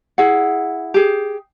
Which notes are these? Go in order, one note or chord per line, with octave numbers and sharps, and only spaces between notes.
E4 G#4 F#5
G4 G#4